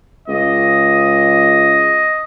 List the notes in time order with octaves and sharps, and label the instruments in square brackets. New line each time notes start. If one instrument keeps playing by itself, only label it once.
[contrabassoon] C#2 [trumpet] D#5